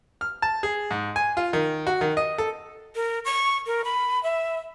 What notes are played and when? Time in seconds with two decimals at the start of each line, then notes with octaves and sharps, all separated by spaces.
0.21 F6
0.42 A5
0.63 G#4
0.91 G#2
1.16 G#5
1.37 F4
1.53 D#3
1.87 F#4
2.01 D#3
2.17 D#5
2.38 A4
2.95 A#4
3.25 C#6
3.67 A#4
3.84 B5
4.23 E5